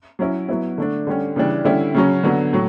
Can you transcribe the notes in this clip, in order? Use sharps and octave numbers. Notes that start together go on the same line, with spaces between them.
F#3 C#4 E4
F#3 B3 E4
D3 A3 D4
D3 G3 C#4
C#3 E3 G3 D4
D3 G3 C#4 E4
C#3 F#3 C#4
D3 F#3 B3
A2 F#3